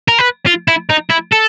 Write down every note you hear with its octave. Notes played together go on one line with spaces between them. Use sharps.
A#4
B4
F4
E4
D#4
E4
A4